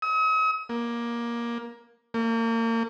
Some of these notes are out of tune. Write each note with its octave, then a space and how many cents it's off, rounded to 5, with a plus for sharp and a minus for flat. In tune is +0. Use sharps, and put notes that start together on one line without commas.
D#6 +45
A#3 +15
A#3 -35